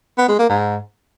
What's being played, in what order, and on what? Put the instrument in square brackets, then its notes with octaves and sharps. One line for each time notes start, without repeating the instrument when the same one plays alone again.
[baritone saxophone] B3
G#3
A#3
G#2